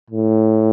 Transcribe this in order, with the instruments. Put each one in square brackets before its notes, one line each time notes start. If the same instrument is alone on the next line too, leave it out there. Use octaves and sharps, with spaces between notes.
[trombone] A2